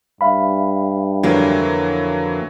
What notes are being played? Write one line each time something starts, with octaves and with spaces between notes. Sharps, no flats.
G2 E5 F5 B5
F2 D3 E3 F#3 A#3